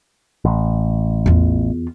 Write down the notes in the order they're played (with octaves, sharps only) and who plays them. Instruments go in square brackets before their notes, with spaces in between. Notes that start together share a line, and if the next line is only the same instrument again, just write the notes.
[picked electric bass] A1
[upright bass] E2 F4